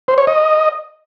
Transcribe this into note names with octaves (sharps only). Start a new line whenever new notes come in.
C5
C#5
D#5